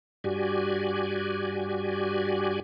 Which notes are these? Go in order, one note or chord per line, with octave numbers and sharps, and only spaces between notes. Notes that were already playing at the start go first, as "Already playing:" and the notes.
G2 F#4 G4 D5 G#5